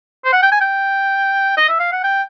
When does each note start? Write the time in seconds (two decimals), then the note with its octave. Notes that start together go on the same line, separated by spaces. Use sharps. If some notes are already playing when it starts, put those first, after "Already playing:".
0.25 C5
0.33 F#5
0.43 G5
0.52 G#5
0.61 G5
1.57 D#5
1.69 E5
1.80 F5
1.92 F#5
2.04 G5